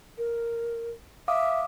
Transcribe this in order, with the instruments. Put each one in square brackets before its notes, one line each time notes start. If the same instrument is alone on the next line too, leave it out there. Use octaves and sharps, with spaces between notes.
[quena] A#4
[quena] E5 [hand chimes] F5 D6 D#6